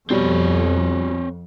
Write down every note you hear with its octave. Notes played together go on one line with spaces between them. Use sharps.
F2 B2 G3 C4 C#5